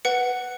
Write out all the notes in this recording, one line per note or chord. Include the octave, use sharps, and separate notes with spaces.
B4 F#5 C#7